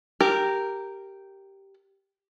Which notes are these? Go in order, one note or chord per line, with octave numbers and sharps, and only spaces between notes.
G4 A#4